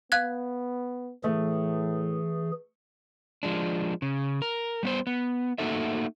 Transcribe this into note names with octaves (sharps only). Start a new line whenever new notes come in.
B3 F5 F#6 G#6
A2 E3 A3 G#4
F3 G#3 D4
C#3
A#4
G3 B3 C5
B3
A3 A#3 D#4 F#4 A4 E5